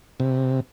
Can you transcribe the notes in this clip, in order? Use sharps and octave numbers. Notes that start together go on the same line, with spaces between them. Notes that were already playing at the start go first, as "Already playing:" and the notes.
C3